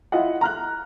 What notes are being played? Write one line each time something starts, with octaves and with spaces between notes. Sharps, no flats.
E4 F4 D#5 F#5
A#5 F6 F#6